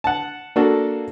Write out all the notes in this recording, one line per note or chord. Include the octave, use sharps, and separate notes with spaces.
F#5 A5
A#3 D4 F#4 A4